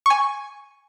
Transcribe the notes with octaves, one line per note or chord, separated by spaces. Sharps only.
G#5 C#6